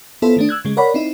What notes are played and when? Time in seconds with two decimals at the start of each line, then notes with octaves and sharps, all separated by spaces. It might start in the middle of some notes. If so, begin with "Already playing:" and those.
0.22 B3 E4 F4 A4 C5
0.37 D#3 A3 D4
0.49 E6 F#6 G#6
0.65 C#3 G#3
0.77 A#4 C#5 D5 F#5 B5
0.94 C4 D#4 E4